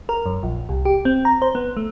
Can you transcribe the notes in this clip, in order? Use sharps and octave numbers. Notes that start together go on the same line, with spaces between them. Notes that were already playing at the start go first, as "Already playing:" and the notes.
A#4
F#2
A#1
C2
G4
C4
A#5
C5
B3
A3